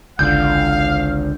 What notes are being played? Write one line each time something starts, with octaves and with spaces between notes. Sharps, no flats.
G#1 C#2 D3 F5 G6